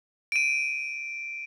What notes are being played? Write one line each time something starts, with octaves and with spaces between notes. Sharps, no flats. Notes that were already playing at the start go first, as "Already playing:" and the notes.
D7 D#7